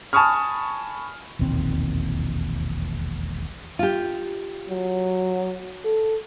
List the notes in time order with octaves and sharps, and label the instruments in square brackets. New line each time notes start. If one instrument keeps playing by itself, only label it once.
[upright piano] G#5 A5 B5 C#6 D#6 F6
[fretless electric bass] E1 A#1 D#2 C4
[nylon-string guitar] F4 G4
[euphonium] F#3
A4